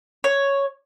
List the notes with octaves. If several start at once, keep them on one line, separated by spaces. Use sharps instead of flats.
C#5